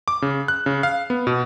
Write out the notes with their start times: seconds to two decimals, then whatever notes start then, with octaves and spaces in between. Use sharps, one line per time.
0.08 D6
0.22 C#3
0.48 F#6
0.66 C#3
0.83 F5
1.10 B3
1.27 B2